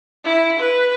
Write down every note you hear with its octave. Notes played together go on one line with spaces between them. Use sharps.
E4
B4